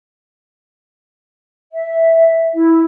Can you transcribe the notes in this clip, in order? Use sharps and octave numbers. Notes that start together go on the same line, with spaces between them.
E5
E4